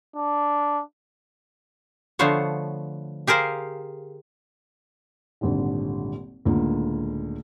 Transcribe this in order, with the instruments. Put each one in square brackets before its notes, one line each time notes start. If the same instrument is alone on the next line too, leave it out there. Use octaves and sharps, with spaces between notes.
[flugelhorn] D4
[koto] D3 F3 A3 B3 C5 C#5
G4 G#4 A#4 C5 F5
[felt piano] D#1 G#1 D3
C#2 A2 D3 A#3